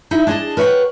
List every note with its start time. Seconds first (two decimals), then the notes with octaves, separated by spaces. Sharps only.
0.11 D#4 E4
0.27 D4 G#4 D#5 G#5 A5
0.57 A#4 B4 C#5 D#5 F#5 G5